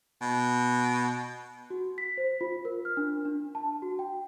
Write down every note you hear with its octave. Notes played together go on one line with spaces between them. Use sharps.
B2
F#4
B6
C5
F4
A#4
F6
D4
D4
A5
F#4
G5